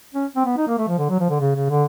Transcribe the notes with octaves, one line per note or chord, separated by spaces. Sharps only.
C#4
C4
B3
D#4
A#3
A3
F3
D3
F#3
F3
D3
C#3
C#3
D3